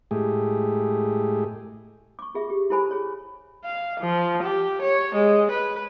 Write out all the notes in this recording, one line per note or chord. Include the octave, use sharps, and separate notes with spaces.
A2 G#3 A3 G4 G#4
C#6 D6
F4 G#4 E5
G4
E4 G4 A4 C5 G#5 B5
G#4 C#5
F5
F3
G4
C#5
G#3
B4